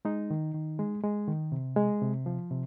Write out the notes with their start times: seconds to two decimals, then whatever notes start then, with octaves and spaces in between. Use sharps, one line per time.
0.05 G#3 D#4
0.30 D#3
0.55 D#3
0.79 G#3
1.04 G#3
1.28 D#3
1.52 C3
1.76 G#3
2.01 C3
2.26 F3
2.51 C3